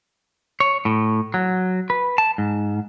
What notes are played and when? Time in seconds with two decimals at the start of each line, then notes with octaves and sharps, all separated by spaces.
0.60 C#5
0.85 A2
1.34 F#3
1.90 B4
2.18 A5
2.38 G#2